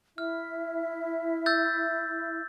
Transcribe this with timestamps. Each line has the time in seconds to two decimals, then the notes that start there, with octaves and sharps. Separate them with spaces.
0.18 E4 E5 F6
1.46 E6 G6 A6